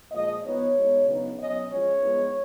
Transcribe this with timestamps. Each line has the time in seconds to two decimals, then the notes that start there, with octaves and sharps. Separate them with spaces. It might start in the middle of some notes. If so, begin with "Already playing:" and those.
0.11 A#2 F3 G#3 D#5
0.42 F3 B3 D#4 C#5
0.75 B2 G#3 D#4
1.05 C#3 F#3 B3 D#4
1.37 B2 F#3 C#4 D#5
1.69 F3 G#3 C#4 C#5
2.00 F3 G#3 B3 D#4